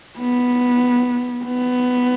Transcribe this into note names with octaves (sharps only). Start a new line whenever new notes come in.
B3
B3